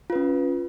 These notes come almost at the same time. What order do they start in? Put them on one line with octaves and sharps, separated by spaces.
F4 B4 C#4